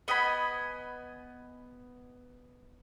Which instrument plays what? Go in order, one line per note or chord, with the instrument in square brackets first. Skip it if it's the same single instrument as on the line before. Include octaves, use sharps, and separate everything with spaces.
[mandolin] B3 D#5 G#5 B5